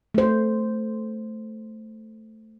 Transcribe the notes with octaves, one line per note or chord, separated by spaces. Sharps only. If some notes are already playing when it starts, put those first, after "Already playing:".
A3 C5